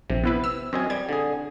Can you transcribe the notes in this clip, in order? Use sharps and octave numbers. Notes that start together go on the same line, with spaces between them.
A#1 C3
B3 E4 B4
E6
F#2 C4 D#5 G#5
G3 G#6
D3 G#4